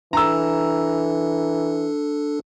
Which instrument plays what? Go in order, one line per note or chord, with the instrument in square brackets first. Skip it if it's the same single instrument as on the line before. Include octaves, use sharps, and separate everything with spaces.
[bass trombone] E3 [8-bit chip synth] D4 A4 [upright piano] A#5 E6